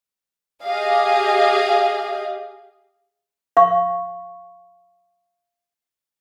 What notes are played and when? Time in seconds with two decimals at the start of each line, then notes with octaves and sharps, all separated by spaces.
0.64 G4 G#4 D#5 F5
3.57 F5 C#6